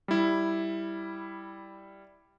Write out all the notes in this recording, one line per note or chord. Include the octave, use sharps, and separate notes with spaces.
G3 E4